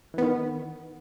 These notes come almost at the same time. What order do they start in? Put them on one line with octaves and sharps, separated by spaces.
E3 B3 D#3